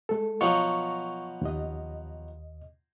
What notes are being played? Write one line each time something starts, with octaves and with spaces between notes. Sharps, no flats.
G#3 A4
B2 F3 F#3 C#6
D#2 D#5